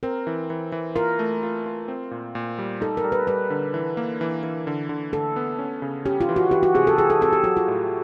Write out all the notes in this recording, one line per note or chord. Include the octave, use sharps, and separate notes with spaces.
C4 A#4
E3
E3
E3
F4 A#4
A3
F4
F4
C4
A#2
A#2
G3
D#4 A4
A#4
G3
B4
G3 B4
D3
E3
A#3
E3
E3
D3
D3
D3 A4
B3
C#4
C#3
C#4 G4
F4
E3
F#4
E3 G4
F#4
C3 G#4
A4
E3 G#4
A4
C4 A4
G4
F#3 F#4
F4
A2